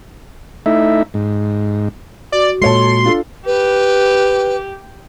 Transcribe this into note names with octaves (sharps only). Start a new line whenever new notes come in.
A3 D#4 E4 E5
G#2
F#4 D5
A#2 G#3 A4 C#5 A5 C6
D4 F4 A4
G4 B4